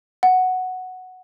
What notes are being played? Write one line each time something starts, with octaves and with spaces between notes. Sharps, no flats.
F#5